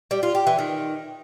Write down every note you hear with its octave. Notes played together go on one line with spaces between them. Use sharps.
G3
F4
G4
E3
D#3